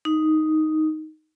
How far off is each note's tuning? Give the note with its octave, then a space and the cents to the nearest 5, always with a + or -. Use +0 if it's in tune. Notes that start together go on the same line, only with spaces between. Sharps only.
D#4 +5